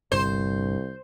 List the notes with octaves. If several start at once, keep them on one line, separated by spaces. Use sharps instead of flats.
G1 C2 G2 D3 C5